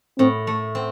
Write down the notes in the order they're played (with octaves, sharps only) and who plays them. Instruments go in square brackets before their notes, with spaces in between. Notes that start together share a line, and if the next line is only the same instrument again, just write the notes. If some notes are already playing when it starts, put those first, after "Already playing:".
[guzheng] A2 [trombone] C4
[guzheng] A3
C4